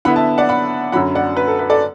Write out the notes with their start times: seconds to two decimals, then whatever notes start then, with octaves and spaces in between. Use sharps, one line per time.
0.05 D3 B3 E4 F#5 B5
0.16 E5 A5
0.38 D5 F#5
0.49 F#5 B5
0.92 F#2 D3 F#3 F#5 B5
1.15 D5 F#5
1.37 B4
1.47 A4
1.59 B4
1.70 A4 D5